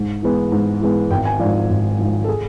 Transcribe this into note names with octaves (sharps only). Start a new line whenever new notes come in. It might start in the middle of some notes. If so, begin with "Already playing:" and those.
Already playing: G#2
E3 G#3 B3
G#2
E3 G#3 B3
G#1 G5
G#5
G#2 F3 D5
G#1
G#2 F3
A4
G#4